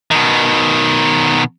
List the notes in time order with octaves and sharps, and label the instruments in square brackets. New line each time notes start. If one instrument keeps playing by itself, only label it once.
[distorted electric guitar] B2 D#3